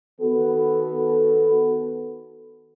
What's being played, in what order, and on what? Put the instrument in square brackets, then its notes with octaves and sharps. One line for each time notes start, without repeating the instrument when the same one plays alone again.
[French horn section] D#3 B3 F#4 A4